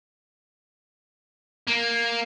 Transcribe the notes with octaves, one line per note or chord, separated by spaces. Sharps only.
A#3